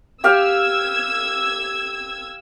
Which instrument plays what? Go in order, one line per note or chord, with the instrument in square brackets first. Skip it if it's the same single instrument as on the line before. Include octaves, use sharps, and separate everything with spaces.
[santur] G4 F5 [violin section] E6 G#6